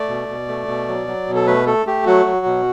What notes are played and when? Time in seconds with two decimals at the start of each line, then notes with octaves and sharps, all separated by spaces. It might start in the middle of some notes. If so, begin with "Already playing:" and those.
Already playing: A3 D5
0.09 B2
0.29 B2
0.48 A3
0.67 B2
0.88 F#3
1.08 F#3
1.27 B2
1.35 A4
1.47 A3 B4
1.66 A3 A4
1.86 A3 G4
2.06 F#3 F#4
2.26 F#3
2.46 B2